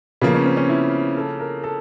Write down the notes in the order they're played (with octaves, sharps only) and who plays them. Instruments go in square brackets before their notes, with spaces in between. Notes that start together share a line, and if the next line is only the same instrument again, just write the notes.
[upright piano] C#3 F3 A#3 [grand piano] B3
[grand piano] C#4
C4
C#4
E4
A4
A#4
A4